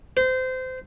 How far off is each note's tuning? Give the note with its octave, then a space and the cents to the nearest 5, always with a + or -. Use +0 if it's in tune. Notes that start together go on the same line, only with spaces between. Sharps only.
C5 -25